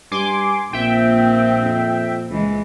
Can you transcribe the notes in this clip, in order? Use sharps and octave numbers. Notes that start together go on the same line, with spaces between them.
G2 G#5 C6 D6
A#1 A#2 C4 E5 G5
F2
C#2 E3 G#3